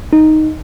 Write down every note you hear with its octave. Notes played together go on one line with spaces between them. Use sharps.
D#4